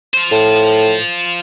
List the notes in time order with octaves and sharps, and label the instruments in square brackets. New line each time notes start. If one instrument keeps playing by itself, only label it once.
[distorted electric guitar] F4 C5
[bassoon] A2